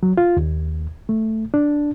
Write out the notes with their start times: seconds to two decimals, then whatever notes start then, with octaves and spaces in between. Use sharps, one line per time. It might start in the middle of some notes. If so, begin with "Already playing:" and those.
0.03 F#3
0.17 F4
0.37 D#2
1.09 A3
1.54 D4